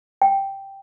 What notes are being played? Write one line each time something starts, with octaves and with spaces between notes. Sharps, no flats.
G5